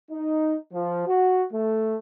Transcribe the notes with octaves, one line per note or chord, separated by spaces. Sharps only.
D#4
F3
F#4
A3